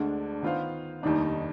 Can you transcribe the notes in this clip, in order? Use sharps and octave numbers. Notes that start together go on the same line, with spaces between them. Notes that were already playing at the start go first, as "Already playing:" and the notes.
Already playing: D2 D3 G#3 D4
D#3 B3 F4 C5 F5
F1 D#2 D#3 G3 D4 D#4